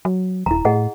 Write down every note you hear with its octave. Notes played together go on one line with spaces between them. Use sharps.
F#3
D#1 E4 A#5
A2 G#4 D#5 F#5